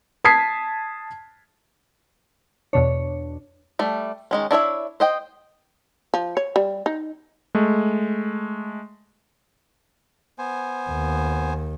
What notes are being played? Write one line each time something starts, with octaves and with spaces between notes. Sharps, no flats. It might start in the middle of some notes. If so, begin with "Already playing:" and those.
A5 D#6 G#6 B6 C7
E2 B2 D4 C#5
G3 A3
D#3 G#3 C#4
D4 E4 C#5 E5
C5 D#5 G5
F3
C#5
G3
D#4
G#3 A3
B3 C5 G#5
D#2